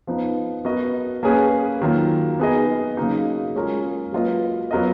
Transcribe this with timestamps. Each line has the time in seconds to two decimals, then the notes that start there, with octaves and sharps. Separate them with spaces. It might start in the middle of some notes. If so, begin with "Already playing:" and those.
0.07 F3 B3 D#4
0.65 B3 F#4 A#4 D#5
1.23 A#3 C#4 G#4 B4
1.81 D#3 F#3 A#3 F4
2.39 B3 D#4 G#4 D#5
2.97 C#3 F#3 A#3 D#4
3.56 G#3 C#4 F4 A#4
4.12 F#3 A#3 F4 B4 D#5
4.71 F#3 B3 F4 A#4 D#5